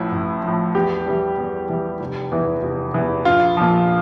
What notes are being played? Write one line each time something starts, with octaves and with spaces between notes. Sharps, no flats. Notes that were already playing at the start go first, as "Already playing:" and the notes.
Already playing: A1 A2 F3 E4
A1
A2 F3
E2 G4
E3 G3
E2
E3 G3
F1
E2 E3
F1
E2 E3
A#1 F4
A#2 F3